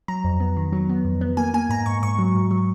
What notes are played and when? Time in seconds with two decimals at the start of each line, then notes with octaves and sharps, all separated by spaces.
0.08 F#3 A#5
0.24 F2
0.40 B3
0.57 D#3
0.72 F#3
0.89 B3
1.05 F2
1.21 B3
1.37 A#3 G#5
1.54 A#3 G#5
1.69 G#2 A#5
1.86 G#2 C#6
2.02 G#2 C#6
2.19 F#3
2.35 G#2
2.51 F#3